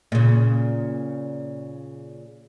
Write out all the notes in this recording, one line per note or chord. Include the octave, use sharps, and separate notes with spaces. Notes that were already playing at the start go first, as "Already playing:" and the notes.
A#2 C#3